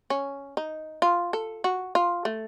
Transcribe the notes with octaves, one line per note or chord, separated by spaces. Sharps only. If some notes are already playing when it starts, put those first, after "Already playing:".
C#4
D#4
F4
A4
F#4
F4
A3